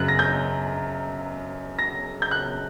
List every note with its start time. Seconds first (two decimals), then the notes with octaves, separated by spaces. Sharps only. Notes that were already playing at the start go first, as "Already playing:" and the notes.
Already playing: F#2 C#3 F#3 F#6
0.08 A#6
0.19 G6
1.79 A#6
2.22 G6
2.31 F#6